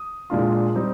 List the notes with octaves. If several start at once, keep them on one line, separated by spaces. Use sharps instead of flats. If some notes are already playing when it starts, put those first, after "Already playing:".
Already playing: D#6
A#2 G#3 D4 F4
G3 C4 D#4